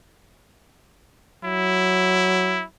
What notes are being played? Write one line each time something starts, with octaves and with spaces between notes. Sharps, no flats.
F#3 E4